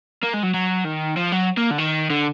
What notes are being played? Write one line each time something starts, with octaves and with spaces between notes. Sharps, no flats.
A#3
G#3
F#3
F#3
D#3
F3
F#3
A#3
D3
D#3
D3